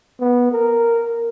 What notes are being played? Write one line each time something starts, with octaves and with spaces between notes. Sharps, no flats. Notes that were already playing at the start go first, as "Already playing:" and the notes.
B3
A#4